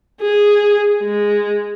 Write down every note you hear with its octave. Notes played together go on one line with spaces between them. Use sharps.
G#4
G#3